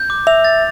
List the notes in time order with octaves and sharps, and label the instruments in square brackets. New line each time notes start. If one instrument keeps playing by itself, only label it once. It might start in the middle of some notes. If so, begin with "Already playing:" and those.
Already playing: [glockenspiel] G6
D6
[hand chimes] E5 [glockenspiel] F7
[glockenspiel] A6